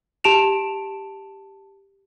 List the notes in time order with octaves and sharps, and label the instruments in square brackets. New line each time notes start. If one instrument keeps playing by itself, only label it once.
[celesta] G4 A5 D7 E7 F7